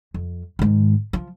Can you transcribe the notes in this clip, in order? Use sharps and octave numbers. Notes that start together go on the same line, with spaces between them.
F2
G#2 D#3
F3